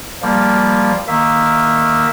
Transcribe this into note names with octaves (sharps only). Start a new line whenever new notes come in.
F3 G3 A#3
D#3 A#3 E5